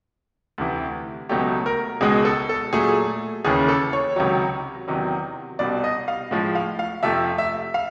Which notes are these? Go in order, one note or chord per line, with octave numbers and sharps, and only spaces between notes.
D2 C3 E3
C#2 B2 F#3 A3 G4
A#4
C#2 B2 G#3 G#4
A4
A4
A#2 F#3 A3 G#4
D#2 C#3 E3 G#4
A4
C#5
C#2 C3 D#3 F#3
E2 C3 D#3 F#3
C2 B2 G3 D5
D#5
F5
A2 F3 G#3
F5
F5
F2 C3 F3 A3 E5
E5
F5